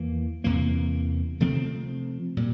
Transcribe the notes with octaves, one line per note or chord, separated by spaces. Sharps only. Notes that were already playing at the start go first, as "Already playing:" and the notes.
Already playing: E2 E3 A#3
E2 C3 E3 A#3
C3 F3 A3 C4
A#2 G3